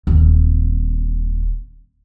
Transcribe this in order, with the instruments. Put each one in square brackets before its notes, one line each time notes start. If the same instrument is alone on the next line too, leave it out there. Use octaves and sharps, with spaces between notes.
[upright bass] D#1 C4